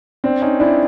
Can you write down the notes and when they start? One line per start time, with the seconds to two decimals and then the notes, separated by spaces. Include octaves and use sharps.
0.24 C4 D4
0.42 C#4 D#4
0.60 D4 E4